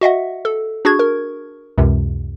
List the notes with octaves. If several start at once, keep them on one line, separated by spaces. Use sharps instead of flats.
F#4 D#5 E5 F#5
A4
D4 F#4 G#4 C#6 G#6
A#4
C#2 F#2 C3